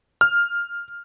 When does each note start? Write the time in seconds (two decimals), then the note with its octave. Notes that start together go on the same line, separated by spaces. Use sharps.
0.21 F6